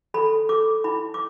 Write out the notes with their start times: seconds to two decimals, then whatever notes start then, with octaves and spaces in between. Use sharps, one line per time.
0.14 A4 B5
0.49 A4 D6
0.84 E4 B5
1.14 D6